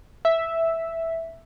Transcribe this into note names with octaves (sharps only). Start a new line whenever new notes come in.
E5